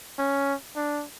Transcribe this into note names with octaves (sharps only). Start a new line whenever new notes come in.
C#4
D4